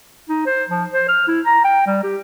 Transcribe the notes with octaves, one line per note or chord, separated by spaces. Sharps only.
D#4
C5
F3
C5
F6
E4
A#5
G5
G3
G4